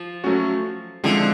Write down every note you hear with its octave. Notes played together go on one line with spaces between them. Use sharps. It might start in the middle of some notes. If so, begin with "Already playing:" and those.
Already playing: F3
F#3 A3 C#4 F#4
D3 F3 G#3 C4 E4